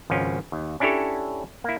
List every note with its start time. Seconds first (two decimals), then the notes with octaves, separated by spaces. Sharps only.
0.10 G#1 C#2 F3 C#4
0.52 D#2
0.80 C#4 D4 E4 G4 A4 C#5
1.64 A#3 E4